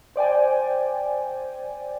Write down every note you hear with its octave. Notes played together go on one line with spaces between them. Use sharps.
C5 D5 G5 G#5